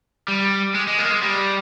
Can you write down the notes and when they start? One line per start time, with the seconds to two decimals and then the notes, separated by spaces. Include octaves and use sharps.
0.28 G3
0.74 G#3
0.87 G#3
0.98 A#3
1.10 G#3
1.23 G3